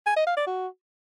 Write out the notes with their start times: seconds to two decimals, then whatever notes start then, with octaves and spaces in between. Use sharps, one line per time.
0.06 G#5
0.16 D#5
0.27 F5
0.37 D5
0.47 F#4